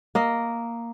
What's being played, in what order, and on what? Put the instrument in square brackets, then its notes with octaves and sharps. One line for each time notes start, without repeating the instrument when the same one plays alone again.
[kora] A#3 D#5